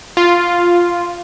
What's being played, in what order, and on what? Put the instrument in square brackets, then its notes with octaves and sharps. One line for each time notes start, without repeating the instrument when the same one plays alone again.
[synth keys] F4